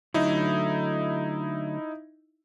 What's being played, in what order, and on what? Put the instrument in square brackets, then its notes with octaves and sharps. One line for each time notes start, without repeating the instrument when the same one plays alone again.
[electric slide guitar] D3 F#3 A3 [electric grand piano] D#4 E4